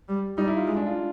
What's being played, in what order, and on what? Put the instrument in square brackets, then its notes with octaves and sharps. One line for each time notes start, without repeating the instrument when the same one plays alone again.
[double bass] G3
[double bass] G3 [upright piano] D#4
[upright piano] E4
F4
[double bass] G#3
[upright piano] D4
F4